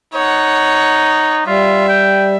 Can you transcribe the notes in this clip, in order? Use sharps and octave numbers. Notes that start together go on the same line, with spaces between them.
D#4 C#5 F#5
G3 F4 E5
G5